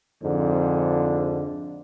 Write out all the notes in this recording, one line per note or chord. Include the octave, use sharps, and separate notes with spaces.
F2 G#2 D3